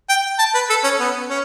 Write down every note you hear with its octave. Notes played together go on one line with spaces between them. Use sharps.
G5
A5
B4
A4
C#4
B3
C#4